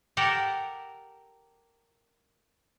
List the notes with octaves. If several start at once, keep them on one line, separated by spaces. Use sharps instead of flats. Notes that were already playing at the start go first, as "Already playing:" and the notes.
G4 A4 A#4 F#5